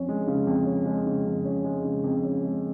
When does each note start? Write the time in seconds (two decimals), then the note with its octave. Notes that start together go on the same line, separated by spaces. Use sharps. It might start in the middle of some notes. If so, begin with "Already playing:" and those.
Already playing: F2 C#4
0.09 G#3
0.27 C#3
0.47 F2
0.66 C#4
0.86 G#3
1.06 C#3
1.26 F2
1.45 C#4
1.64 G#3
1.84 C#3
2.04 F2
2.24 C#4
2.44 G#3